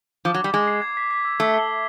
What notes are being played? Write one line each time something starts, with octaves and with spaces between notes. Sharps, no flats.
F3 D6
F#3
D6
G3
G#3 D6
C7
G#6
B6
B6
E6
A3 E6
G7
E6